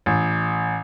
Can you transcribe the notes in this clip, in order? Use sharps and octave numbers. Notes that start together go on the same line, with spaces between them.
A1